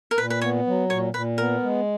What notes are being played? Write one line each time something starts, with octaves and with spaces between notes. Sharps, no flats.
A#4
A#2 B4
B4
B3 C#5
F#3
A#2 C#5
A#2 B4
B3 A#4
G#3